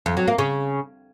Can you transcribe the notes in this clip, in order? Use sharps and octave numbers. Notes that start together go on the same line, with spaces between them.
F2
F#3
A#3
C#3